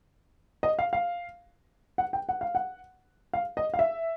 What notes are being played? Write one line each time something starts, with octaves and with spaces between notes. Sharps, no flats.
D#5
F5
F5
F#5
G5
F#5
F5
F#5
F5
D#5
F5
E5